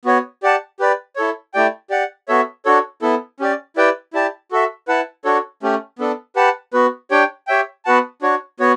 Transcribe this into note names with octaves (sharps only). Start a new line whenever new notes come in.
B3 F#4 C#5
G4 D5 F#5 A5
G4 B4 D5
E4 A4 C#5
A3 E4 G4 D5 G5
G4 D5 F#5
B3 F#4 A4 C#5 E5
D4 F#4 A4 C#5
B3 E4 A4
C#4 G4 D5
E4 G4 B4 D5 G5
E4 G4 D5 A5
F#4 A4 E5
E4 B4 F#5 A5
D4 F#4 A4 C#5
A3 C#4 G4
B3 D4 A4
G4 B4 F#5 A5
B3 F#4 B4
D4 G4 C#5 G5
G4 C#5 E5 G5
B3 F#4 B4 F#5 A5
D4 F#4 C#5
B3 F#4 C#5